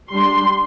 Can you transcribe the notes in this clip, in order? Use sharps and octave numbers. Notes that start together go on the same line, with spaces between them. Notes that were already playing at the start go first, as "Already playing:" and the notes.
G3 D4 C6